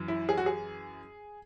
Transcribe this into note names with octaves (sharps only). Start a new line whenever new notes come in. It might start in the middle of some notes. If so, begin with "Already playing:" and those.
Already playing: F#2 E3
E4
G#4
F#4
G#4